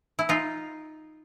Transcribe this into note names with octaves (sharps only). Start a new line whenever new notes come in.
E4
D#4 F4